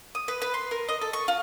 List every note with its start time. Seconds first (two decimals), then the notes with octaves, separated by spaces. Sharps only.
0.15 D#6
0.28 B4
0.42 B4
0.54 C6
0.71 A#4
0.89 D#5
1.01 A4
1.13 C#6
1.28 F4